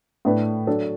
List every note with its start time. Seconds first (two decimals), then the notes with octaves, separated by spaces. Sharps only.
0.25 A2 A3 D4 B4
0.67 F#3 D4 F#4 A4